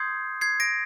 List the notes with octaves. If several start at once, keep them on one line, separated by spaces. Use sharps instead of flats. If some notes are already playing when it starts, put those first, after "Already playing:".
Already playing: C6 D#6 G6 G#6 C7
G#6 C7
A#6 D7